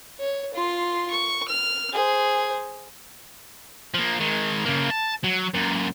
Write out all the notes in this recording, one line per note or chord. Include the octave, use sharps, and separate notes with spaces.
C#5
F4 C6
C#6
F6
G#4 C5
F3 A#3
D#3 G#3
C#3 A#3
A5
F#3
F#2 A#2